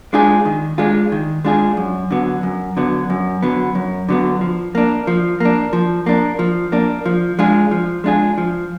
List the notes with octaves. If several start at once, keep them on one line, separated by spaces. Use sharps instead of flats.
G#3 D4 F4 G#4
D#3
G#3 D4 F4 G#4
D#3
G#3 D4 F4 G#4
F#2
D3 F#3 B3
F#2
D3 F#3 B3
F#2
D3 F#3 B3
F#2
D3 F#3 B3
F3
A#3 D4
F3
A#3 D4
F3
A#3 D4
F3
A#3 D4
F3
G#3 D4 F4 G#4
F3
G#3 D4 F4 G#4
F3